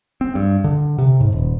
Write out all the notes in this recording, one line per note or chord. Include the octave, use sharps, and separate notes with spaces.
C4
G2
D3
C3
G#2
D#1